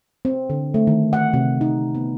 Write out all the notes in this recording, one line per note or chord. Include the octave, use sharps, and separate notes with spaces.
C4
D3
A3
D#3
F#5
C3
D#4
B3